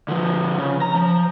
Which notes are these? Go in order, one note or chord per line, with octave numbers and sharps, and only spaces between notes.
D3 F3
C#3
A#5
F3